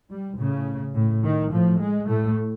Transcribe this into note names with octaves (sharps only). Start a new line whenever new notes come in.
G3
A2 C#3
A2
D#3
A2 F3
G#3
A2 A3